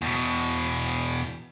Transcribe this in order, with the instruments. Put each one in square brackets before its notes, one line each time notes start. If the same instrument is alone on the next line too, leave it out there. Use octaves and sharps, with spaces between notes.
[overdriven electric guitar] E2 B2